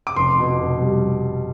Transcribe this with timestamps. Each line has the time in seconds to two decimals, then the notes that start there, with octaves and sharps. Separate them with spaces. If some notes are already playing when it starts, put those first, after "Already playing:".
0.07 D6
0.16 F1 C6
0.39 B2
0.60 F1
0.81 G3